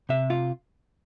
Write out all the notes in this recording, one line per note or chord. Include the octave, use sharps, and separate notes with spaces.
C3 E5
F4